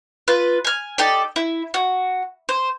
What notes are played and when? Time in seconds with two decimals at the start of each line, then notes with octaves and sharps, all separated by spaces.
0.28 F4 B4
0.65 G#5 F6
0.98 D#4 G4 A4 D5
1.36 E4
1.74 F#4
2.49 C5